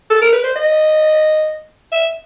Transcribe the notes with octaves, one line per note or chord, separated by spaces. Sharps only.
A4
A#4
B4
C5
D#5
E5